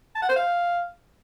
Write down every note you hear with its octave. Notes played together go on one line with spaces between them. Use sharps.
A5
F#5
C5
F5